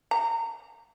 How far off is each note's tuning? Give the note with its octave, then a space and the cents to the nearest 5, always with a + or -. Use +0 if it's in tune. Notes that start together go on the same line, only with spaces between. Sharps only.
A#5 -25